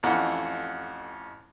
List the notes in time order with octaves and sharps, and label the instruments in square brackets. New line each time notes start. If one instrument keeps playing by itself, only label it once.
[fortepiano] A1 F2 E3 F#5